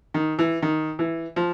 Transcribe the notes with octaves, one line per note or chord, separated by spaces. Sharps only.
D#3
E3
D#3
E3
F3